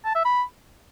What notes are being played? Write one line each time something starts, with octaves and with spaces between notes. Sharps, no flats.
A5
E5
B5